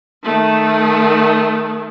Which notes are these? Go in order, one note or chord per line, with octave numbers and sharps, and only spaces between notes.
D#3 A3